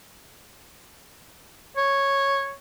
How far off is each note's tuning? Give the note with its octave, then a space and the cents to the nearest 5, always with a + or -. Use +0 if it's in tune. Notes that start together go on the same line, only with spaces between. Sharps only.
C#5 -5